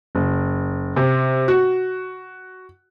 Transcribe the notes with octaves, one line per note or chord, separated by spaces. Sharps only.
F#1
C3
F#4